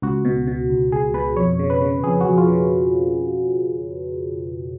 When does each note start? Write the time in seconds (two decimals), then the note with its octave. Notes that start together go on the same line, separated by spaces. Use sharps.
0.02 C#2 F#4
0.25 B2
0.47 B2
0.70 C#2
0.92 C#2 G#4
1.14 B2 B4
1.36 F2 C#5
1.59 C#3
1.70 B4
1.81 C#3
2.03 F2 G#4
2.21 F2 F#4
2.37 F4
2.48 C#3